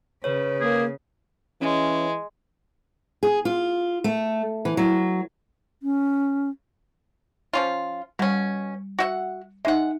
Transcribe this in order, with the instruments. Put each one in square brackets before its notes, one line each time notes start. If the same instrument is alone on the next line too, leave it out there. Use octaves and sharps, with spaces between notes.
[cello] C#3 [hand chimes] B4 C#5
[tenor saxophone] A#3 [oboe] G#4
[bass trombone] E3 [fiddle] G#3 [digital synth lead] C#4
[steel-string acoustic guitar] G#4
F4
A3
E3
F#3
[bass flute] C#4
[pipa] F3 C#4 F4
[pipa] B2 C#4 [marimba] G3
[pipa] F#4 E5 F#5
[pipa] G#3 F#5 [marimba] D#4 E5